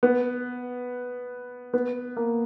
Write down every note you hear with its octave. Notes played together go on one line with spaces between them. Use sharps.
B3
B3
A#3